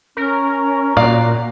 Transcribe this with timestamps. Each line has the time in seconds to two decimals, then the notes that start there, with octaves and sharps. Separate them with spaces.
0.17 C#4 A#4
0.97 A#2 F#4 D5 F5